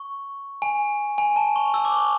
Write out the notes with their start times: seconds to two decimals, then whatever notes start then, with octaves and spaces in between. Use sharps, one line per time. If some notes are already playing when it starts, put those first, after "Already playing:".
Already playing: C#6
0.62 G#5
1.18 G#5
1.36 A5
1.56 C#6
1.74 E6
1.85 D6
1.96 C#6